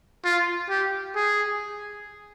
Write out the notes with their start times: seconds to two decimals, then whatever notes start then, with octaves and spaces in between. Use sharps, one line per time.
0.25 F4
0.70 G4
1.16 G#4